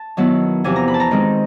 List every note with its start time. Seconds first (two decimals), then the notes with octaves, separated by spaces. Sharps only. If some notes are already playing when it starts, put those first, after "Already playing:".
Already playing: A5
0.17 D#3 F#3 B3 E4
0.64 E2 C3 F3 G#5
0.76 A#5
0.88 B5
0.94 A5
1.00 A#5
1.11 D#3 G#3 C4 D#4